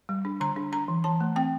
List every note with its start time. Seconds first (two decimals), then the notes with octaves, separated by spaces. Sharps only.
0.09 G3
0.25 D4
0.40 D3 A#5
0.56 D4
0.72 D4 A#5
0.88 E3
1.04 E3 A5
1.21 A3
1.36 C4 G5